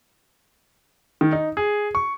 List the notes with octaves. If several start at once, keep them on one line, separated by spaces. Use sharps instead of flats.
D#3
D#4
G#4
C#6